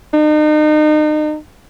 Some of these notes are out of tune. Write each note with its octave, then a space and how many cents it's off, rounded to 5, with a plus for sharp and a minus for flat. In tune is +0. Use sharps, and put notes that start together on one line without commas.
D#4 -35